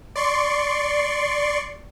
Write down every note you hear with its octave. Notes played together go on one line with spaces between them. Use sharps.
D5 C6 C#6